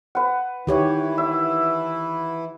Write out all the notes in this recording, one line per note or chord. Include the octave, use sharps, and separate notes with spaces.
B4 F#5
D#3 E3 E4 G4 C#5
E5